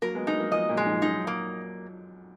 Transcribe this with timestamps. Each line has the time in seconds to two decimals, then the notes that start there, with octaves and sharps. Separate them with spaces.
0.02 F#3 A#3 A#4
0.15 G#3 B3
0.27 G#3 B3 D#4
0.40 F#3 A#3
0.52 F3 G#3 D#5
0.69 F#2 A#2
0.77 G#3
0.86 F2 G#2
1.02 F#2 D#4
1.15 F#2
1.27 A#3